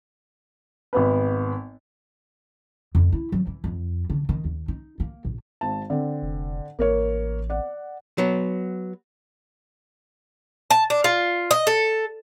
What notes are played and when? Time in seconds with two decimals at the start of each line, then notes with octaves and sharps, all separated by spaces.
0.93 G#1 B3 B4
2.95 F2
3.12 E4
3.32 F#3
3.47 E3
3.64 F2
4.10 D3
4.29 D#3
4.45 D#2
4.68 D#4
5.00 A#3
5.25 A#1
5.61 G#1 A5
5.90 D3 C4
6.22 F1
6.79 A1 A#3 A#4 C#5
7.50 D5 F#5
8.18 F#3 B3
10.70 A5
10.90 D4
11.04 F4
11.51 D#5
11.67 A4